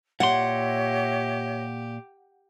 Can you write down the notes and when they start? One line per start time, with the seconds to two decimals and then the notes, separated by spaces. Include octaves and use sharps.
0.20 A#2 G4 C#5 D#5 E5 F#5 C6